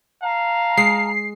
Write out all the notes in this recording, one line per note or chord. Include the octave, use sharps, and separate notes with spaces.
F5 A5 A#5
G#3 C7